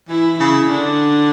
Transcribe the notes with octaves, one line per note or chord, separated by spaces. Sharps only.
E3 E4
C#3 E4
C#3
D3 D4